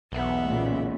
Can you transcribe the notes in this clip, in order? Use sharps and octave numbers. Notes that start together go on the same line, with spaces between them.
B1 E2 B3 E5
A#2 C#3